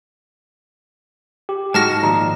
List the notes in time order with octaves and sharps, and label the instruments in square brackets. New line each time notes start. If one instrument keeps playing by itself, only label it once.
[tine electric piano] G4
[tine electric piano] G#2 [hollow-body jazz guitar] G#3 F#4 [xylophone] A5 F6 A#6
[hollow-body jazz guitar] A#2 D#3 F3 [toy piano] A#5